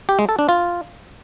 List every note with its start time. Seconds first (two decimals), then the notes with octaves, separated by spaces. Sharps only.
0.09 G4
0.19 G#3
0.29 A4
0.39 D4
0.49 F4